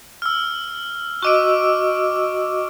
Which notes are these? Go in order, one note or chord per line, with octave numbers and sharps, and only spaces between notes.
E6 F6
F#4 D#5 C#6 D6 E6 D7